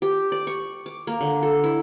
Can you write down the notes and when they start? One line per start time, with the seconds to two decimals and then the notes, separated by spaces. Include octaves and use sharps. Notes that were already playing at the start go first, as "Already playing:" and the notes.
0.02 G4
0.32 D5
0.47 C#6
0.86 D6
1.07 A#3
1.21 D3
1.43 A4
1.64 E4